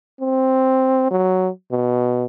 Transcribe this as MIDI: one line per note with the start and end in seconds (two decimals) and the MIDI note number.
0.21 1.08 60
1.11 1.49 54
1.72 2.26 47